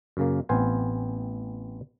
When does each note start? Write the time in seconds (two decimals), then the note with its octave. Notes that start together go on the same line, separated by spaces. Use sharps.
0.17 F#2 C#3 A#3
0.49 A1 B3 C4 C5 F5 G#5